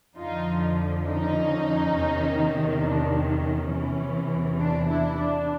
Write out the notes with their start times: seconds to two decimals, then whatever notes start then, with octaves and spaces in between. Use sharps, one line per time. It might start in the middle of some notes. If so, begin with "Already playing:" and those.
0.17 F2 D3 F3 D#4 F4
1.06 C#4 D#4
1.95 E2 C3 D#3
2.82 D4
3.27 C#4
3.70 E2 C3 E3
4.59 D4
4.88 D4 E4
5.17 D4